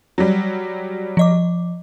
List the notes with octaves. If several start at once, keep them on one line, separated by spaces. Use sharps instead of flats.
F#3 G3
F3 D#5 D6